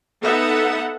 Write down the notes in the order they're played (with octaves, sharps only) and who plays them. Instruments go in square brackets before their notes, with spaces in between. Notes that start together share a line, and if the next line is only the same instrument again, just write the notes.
[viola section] B3 D#4 A4 E5 F#5